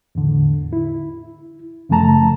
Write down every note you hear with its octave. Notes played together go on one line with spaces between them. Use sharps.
E2 A2 D3
E4
F#2 C#3 F3 A3 A5 A#5